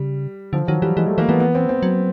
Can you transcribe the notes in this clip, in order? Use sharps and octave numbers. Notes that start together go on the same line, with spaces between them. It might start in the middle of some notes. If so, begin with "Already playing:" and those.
Already playing: C#3 G3
D3 F3
D#3 F#3
E3 G3
E3 G#3
G3 A3
E3 A#3
E3 B3
B3
C4
C4
F#3